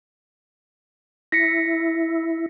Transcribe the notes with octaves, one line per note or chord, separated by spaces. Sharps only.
E4 A#6 B6 C#7